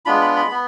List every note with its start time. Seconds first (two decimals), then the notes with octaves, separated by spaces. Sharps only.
0.05 G#3 B3 D4 F4 B5
0.21 B5
0.36 B5
0.51 B3